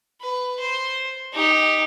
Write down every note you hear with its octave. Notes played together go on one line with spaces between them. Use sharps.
B4
C5
D#4 G4